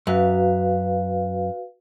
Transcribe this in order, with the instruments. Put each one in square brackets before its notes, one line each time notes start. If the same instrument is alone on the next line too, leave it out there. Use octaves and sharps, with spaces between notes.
[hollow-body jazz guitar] F#2 [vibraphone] F#4 B4 F5